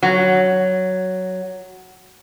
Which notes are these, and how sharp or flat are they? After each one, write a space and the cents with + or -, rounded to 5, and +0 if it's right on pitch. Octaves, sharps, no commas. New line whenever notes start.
F#3 +5